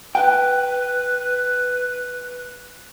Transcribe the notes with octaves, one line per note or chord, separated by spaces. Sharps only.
B4 G5